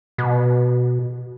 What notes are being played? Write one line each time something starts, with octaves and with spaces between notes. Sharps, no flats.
B2